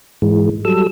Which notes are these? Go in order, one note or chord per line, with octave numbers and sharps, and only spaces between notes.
G#2 E3 G#3
F#3 G3 A4 E6